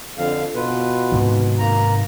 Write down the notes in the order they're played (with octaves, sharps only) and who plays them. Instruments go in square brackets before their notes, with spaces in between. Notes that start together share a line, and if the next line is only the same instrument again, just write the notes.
[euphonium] F2 [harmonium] D3 F5
[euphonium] B2 [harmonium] F4 B4
[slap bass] G#2 C3 D#3
[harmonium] A#3 A#5